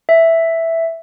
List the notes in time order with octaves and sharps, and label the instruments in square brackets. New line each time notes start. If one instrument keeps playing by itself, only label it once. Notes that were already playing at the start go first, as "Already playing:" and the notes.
[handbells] E5